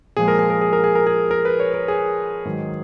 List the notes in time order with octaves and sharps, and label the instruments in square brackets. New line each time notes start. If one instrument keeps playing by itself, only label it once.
[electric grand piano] A#2 F3 G#3 G#4
A#4
G#4
A#4
G#4
A#4
G#4
A#4
G#4
A#4
B4
C#5
A#4
G#4
G#2 D#3 F#3